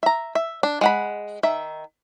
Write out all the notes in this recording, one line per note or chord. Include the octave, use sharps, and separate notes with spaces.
E5 A#5
E5
D4
G#3 F#5 B5
D#3 E5